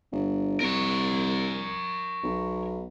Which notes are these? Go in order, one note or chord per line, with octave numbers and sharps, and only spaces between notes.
G1
C2 A#4 C#5
B1